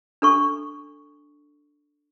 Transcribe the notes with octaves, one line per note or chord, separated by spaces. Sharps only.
D4 A4 C#6